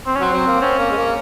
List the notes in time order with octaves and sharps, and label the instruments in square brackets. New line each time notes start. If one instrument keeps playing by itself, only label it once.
[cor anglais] C4
C#4
[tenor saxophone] F#3 [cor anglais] C4
[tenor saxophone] F#3
A#3
[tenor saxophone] C4 [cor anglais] C#4
[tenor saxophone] A#3
G#3
A#3